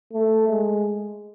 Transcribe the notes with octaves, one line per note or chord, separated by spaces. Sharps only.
A3
G#3